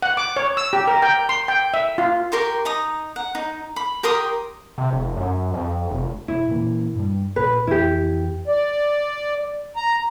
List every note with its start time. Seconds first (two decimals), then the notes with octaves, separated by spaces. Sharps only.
0.02 F#5
0.17 D6
0.36 C#5
0.57 E6
0.73 G4
0.87 A#4
1.02 G5
1.29 C6
1.48 G5
1.74 E5
1.98 F4
2.32 G4 A#4 C6 C#6
2.65 D#4 A#5 D#6
3.16 F#5
3.35 D#4
3.76 B5
4.03 G4 A#4 C6 D#6
4.78 C3
4.93 F1
5.17 F#2
5.54 F2
5.90 F1
6.28 E1 E4
6.49 A#2 E3 A#3
6.95 G2 G3
7.36 A#1 A#2 B4
7.67 F2 E3 E4 G4
8.48 D5
9.76 A#5